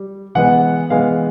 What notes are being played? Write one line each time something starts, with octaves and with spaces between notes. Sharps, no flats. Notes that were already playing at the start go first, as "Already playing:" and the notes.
Already playing: G3
E3 G#3 B3 F#5
E3 G#3 B3 F5